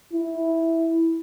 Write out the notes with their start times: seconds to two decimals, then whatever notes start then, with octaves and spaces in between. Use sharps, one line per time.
0.13 E4